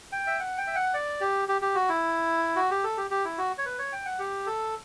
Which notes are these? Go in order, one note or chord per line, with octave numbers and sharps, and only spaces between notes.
G5
E5
F#5
G5
E5
F#5
D5
G4
G4
G4
F#4
E4
F#4
G4
A4
G4
G4
E4
F#4
C#5
B4
C#5
G5
F#5
G4
A4